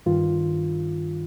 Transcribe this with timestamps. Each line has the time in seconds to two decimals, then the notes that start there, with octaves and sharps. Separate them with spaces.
0.06 G2 D#3 F4